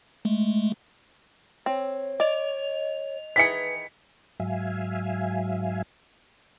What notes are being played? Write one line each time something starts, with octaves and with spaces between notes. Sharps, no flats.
G#3 A3
C4 C#5
D5 D#5 F7
D#3 E3 G#4 B4 B6 C#7
G#2 F#3 E5 F5 G#5